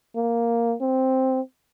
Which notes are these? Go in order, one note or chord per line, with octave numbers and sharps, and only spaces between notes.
A#3
C4